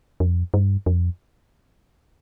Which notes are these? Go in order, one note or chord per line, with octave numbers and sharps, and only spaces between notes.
F2
G2
F2